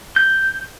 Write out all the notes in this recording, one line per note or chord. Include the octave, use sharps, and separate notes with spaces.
G6